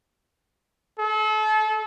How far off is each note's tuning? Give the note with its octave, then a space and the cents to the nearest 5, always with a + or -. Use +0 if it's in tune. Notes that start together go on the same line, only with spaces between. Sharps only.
A4 -35